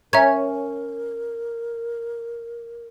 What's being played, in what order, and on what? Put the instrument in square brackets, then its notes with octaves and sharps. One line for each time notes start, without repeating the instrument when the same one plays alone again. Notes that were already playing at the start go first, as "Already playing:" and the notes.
[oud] C#4 [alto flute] A#4 [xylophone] E5 A#5 G#6